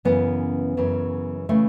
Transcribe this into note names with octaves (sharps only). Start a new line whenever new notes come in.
F#2 C#3 E3 B3
F#2 C#3 E3
C#3 E3 A3